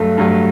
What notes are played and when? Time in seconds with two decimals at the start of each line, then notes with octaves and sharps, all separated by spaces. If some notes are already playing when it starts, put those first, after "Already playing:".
Already playing: G2 F#3 A3
0.17 G2 F#3 A3